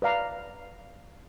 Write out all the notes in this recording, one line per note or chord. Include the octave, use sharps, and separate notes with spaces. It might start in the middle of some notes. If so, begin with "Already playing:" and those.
B4 D5 F5 A#5